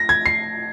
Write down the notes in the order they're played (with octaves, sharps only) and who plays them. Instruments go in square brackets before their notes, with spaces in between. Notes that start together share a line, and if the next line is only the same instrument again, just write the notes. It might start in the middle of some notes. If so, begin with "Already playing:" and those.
Already playing: [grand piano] A#6
G#6
C7